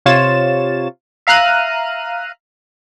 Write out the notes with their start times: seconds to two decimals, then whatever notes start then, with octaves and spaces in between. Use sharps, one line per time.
0.06 C3 F4 C#5 A6 E7
1.27 E5 F5 A#5 F6 F#6 D#7